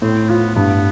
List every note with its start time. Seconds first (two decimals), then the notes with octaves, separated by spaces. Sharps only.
0.02 A2 C4
0.29 B3 F4
0.55 G2 B3